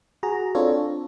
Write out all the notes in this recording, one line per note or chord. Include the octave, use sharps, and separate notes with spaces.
F#4 G#4 A#5
C4 D4 F4 A4 C#5